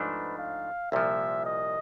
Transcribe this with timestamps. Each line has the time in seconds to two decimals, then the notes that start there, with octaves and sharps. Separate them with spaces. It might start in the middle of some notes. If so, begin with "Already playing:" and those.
Already playing: G#2 F3 A3 D4 B4
0.38 F5
0.92 C2 A#2 F3 E5
1.46 D#5